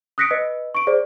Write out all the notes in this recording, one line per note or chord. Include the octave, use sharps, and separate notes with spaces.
D#6 F#6 A#6 B6 C#7 D7
B4 D#5
C#6 D7
G#4 C5 D5